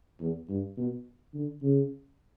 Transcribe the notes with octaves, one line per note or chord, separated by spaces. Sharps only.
E2
G2
B2
D3
C#3